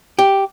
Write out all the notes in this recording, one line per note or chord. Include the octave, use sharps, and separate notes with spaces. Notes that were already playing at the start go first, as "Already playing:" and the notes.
G4